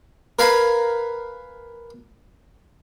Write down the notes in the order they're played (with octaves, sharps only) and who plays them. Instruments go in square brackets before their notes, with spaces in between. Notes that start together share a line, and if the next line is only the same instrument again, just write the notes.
[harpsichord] A#4 B4 F5 G#5 A#5 B5